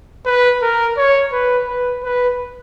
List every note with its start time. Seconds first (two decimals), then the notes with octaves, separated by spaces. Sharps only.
0.25 B4
0.62 A#4
0.97 C#5
1.32 B4
1.67 B4
2.03 B4